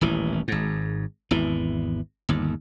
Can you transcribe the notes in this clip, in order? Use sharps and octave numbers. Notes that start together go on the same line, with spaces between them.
D#1 A1 E3
G#1 G#2
G#1 E2 E3
G1 D#2